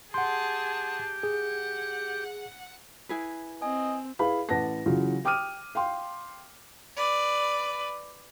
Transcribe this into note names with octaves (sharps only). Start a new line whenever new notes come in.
G4 G#4 F#5 A5 C6
G#4 F#5
E4 G#4 B4
C4 D#5 G#5
E4 G#4 B4 F5 B5
A1 B4 F#5 A5 A#6
C#3 E3 F#3 F4
G5 D6 D#6 F6 D#7
F5 G5 C6
B4 D5